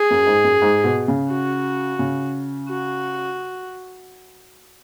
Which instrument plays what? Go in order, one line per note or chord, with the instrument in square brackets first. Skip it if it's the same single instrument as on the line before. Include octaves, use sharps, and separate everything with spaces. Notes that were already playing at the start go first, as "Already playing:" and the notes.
Already playing: [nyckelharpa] G#4
[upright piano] F#2
G#2
F#2
G#2
B2
C#3
[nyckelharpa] F#4
[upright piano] C#3
[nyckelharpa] F#4